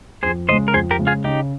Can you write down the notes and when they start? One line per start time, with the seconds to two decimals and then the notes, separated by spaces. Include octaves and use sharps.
0.23 F2 G#4 C5
0.49 C#3 G#3 C5 D#5
0.68 A#4
0.74 F2 G#4 C5
0.91 G4 A#4
0.98 C#3 G#3
1.07 F4 G#4
1.24 C#3 D#4 G4